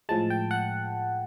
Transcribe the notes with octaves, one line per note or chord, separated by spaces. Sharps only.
A2 F3 G#3 A5
G5
F#5